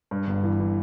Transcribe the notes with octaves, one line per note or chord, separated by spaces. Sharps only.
G2
G1
E3
E3